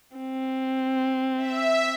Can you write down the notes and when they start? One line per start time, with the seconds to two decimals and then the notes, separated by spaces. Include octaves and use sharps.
0.17 C4
1.36 E5